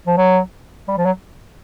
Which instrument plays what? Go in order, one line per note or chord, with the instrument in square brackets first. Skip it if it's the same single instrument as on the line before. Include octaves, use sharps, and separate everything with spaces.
[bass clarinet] F3
F#3
G3
F3
F#3